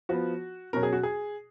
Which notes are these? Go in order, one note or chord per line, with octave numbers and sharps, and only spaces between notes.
F3 B3 F#4
B2 F#3 C#4 A#4
G#4
F#4
G#4